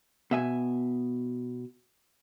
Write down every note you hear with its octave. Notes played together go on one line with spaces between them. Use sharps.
B2 E5 G#5